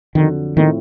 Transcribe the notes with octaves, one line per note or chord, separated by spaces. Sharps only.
F2 D3 D#3 F#3
A2 D#3 F3 A3 C4 E4